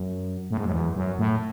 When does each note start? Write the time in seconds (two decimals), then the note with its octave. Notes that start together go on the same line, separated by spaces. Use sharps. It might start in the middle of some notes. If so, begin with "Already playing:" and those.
Already playing: F#2
0.51 A2
0.58 G#2
0.65 F#2
0.72 E2
0.96 F#2
1.19 A2